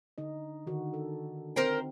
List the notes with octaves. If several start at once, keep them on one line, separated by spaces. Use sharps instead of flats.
D3 D#4 D#5
D3 D#3 F#4
A4
C4 D#4 A#4 C5 G5